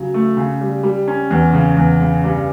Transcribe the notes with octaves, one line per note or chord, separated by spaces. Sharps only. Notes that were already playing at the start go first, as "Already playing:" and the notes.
Already playing: C#3 F#3
A3
C#3
G3
G3
C#4
E2
C#3
E2
C#3
G2